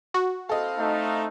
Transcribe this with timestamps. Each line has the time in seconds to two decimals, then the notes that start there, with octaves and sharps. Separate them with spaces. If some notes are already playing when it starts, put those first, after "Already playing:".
0.14 F#4
0.49 C4 E4 A4 D#5 F5
0.78 A3 D#4